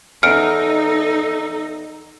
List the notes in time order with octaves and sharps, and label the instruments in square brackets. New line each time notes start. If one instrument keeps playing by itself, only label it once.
[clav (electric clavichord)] E2 [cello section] D#4 [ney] A4 [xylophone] F6 C#7 D7